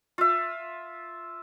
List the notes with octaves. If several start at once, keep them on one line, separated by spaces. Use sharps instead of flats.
F4 E5